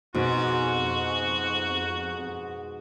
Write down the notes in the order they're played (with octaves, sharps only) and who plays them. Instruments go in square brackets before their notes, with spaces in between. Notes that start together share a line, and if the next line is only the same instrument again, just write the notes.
[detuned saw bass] F2 [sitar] G#2 [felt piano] B2 [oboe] F#4